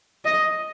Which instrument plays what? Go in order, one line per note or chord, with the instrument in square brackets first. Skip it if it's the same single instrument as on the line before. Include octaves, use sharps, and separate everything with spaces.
[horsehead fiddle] D#5